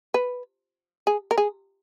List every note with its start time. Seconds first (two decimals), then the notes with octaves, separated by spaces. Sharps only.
0.14 B4
1.07 G#4
1.31 A#4
1.38 G#4